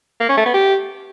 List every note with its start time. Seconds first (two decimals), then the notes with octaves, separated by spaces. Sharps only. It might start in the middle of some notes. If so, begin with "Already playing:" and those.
0.21 A#3
0.29 C#4
0.37 A3
0.46 B3
0.54 G4